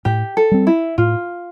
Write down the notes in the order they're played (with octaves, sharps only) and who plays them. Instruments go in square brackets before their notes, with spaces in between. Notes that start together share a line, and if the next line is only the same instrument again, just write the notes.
[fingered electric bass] A2 [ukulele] G4
[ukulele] A4
[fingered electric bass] G3 C4
[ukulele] E4
[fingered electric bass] A2 [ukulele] F4